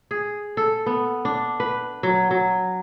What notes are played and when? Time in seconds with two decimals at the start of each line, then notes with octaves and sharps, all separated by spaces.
0.11 G#4
0.57 A4
0.86 B3
1.25 D4
1.60 B4
2.03 F#3
2.31 F#3